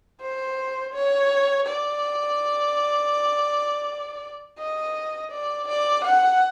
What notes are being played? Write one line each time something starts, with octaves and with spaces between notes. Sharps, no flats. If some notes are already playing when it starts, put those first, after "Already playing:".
C5
C#5
D5
D#5
D5
D5
F#5